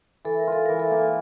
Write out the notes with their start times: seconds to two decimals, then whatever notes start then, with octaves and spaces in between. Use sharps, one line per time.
0.25 E3 A4
0.39 A#4
0.47 F4
0.52 A4
0.66 E3 A#4
0.80 A4
0.91 A#3